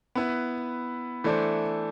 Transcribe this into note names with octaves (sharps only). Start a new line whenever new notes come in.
B3 E4 B4
E3 A3 D4 A4 C5